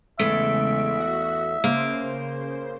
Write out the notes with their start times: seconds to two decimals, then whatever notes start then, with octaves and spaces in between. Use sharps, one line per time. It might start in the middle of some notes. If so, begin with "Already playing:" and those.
0.19 E2 C#3 G#3 A3 E5 D7
0.99 F#4
1.64 C#3 A#3 C5